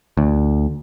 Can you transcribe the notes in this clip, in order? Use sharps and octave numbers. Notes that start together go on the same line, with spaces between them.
D2